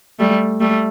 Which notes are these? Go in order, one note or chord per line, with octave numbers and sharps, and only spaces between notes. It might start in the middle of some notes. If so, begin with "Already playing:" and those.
G3 A3
G3 A3